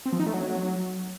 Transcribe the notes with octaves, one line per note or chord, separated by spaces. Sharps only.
C4
F3
D#4
A3
F#3